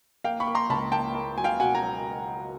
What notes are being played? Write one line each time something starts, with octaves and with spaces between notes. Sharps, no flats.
A#3 F5 G5
B5 C#6
A#3
A#5 C6
C#2 A5 B5
A#3 G5 A5
A#3
F#3 G#5
F5 G5
B2 F#5 G#5
G#5 A#5
F#3